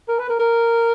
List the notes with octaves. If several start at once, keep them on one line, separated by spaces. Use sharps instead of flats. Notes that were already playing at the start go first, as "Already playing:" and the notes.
A#4
B4
A#4
A#4